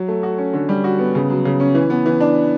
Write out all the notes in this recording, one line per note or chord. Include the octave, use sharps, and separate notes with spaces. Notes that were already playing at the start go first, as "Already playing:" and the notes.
Already playing: F#3
A3
F#4
C#4
D3
G3
F#4
B3
C#3
F#3
C#3
C#4
E3
B3
E3
D4